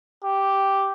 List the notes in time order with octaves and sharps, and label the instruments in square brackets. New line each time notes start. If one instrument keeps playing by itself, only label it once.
[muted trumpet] G4